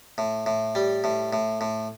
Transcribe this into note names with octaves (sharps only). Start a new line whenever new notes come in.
A2
A2
G3
A2
A2
A2